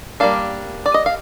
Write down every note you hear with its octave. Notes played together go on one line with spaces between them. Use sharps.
G3 A#3 D4 F5
D5
D#5
F5